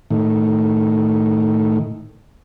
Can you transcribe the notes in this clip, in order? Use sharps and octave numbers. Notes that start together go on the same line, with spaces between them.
A2 D#3